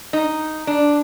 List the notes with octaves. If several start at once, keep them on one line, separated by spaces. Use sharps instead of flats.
D#4
D4